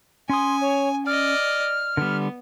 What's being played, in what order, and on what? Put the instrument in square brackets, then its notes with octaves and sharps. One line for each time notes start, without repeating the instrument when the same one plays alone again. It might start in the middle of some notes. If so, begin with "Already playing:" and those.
[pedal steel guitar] C#4 D#6 [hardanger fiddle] G#5 [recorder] C6
[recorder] C#5
[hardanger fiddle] D5 D#5 [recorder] F6
[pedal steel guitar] D3 G3 [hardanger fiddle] B3